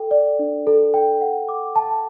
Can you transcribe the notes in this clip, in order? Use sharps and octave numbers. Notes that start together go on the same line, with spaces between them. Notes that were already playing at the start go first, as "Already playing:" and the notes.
Already playing: A4 G5
D5
D4
A4
G5
F#5
D6
A5